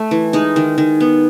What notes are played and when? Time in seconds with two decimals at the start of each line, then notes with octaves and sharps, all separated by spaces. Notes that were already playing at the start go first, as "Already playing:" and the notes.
Already playing: A3
0.11 E3
0.33 G#3 D#4
0.56 D#3
0.78 D#3
1.00 B3